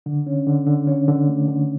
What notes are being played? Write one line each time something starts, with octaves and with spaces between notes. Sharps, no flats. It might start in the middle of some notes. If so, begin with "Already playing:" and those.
D3
C#4
D3
D3
C#4
D3
A3
D3